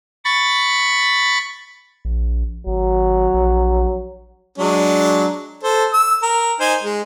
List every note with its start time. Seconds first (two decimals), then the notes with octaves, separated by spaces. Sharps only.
0.25 B5 C#6 A6
2.05 A#1
2.67 G#1 F#3
3.34 A#1
4.58 F#3 G#3 D4
5.63 A4 C5
5.93 E6
6.22 A#4
6.60 D#4 C5 G#5
6.83 G#3